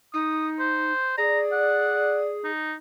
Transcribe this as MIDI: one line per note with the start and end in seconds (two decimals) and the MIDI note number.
0.14 0.92 63
0.14 0.49 87
0.59 1.15 72
1.18 2.51 68
1.18 2.31 74
1.18 1.39 82
1.52 2.19 78
2.44 2.74 63